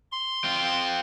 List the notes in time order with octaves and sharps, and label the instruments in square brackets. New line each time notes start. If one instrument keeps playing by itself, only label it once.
[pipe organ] C6
[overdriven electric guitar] C4 F4